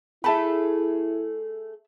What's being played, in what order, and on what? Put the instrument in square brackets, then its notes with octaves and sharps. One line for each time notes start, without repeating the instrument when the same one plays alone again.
[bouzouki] A3 G#4 A4 [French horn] E4 [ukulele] E5 A5 B5